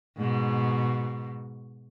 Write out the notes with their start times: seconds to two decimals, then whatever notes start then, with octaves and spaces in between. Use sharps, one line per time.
0.18 G#2 B2